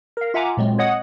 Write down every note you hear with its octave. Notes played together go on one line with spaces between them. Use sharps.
A#4 F5
F4 E5 F#5 G#5 A#5 D6
A#2 F#3 G#3 C4
C#5 D#5 F#5 D#6